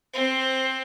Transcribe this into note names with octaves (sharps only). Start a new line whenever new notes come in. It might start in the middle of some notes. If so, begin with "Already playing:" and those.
C4 C5